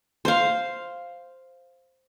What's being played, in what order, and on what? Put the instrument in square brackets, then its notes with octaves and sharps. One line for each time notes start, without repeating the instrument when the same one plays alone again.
[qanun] C5 F5